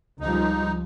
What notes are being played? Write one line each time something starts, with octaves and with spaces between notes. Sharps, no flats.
C#2 F3 G3 D#4